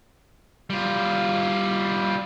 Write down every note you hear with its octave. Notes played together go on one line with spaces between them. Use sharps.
G3 F4